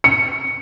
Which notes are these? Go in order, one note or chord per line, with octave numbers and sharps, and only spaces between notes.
C#7